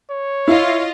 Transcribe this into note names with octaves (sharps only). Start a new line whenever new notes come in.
C#5
E4 F4 D#5 F5